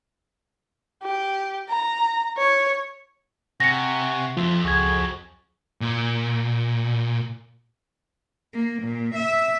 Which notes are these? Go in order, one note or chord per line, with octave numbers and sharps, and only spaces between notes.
G4
A#5
C#5
C3 F#5 G#5 C#6 A#6 C#7
F2 F3 F4 E5
C#2 F#4 G#4 G#6
A#2
A#3
A#2
E5